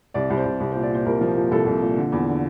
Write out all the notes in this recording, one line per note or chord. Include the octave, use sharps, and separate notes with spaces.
C2 D5
C2
C5
C2
C2
C5
A#2
D5
A#2 C5
C2 A#4
F3
A#2
C2 A4
C2
A#2
D3
E2
D3